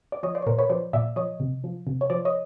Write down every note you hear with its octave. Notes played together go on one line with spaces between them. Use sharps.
D5
F3 C#5 D#5
C5 D5
C#5
A#2 A#4 C5
B4 C#5
F3 C5 D5
A#2 D5 E5
F3 C#5 D#5
C3
F3
C3
C#5
F3 C5 D5
C#5 D#5